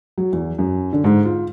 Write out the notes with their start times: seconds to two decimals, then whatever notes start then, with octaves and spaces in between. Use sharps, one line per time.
0.18 F#3
0.33 E2
0.59 F#2
0.93 D3
1.04 G#2
1.25 F4